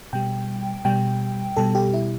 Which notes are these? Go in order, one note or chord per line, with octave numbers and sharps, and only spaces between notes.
B2 G3 G5
B2 G3 G5
B2 G3 A4
G4
E4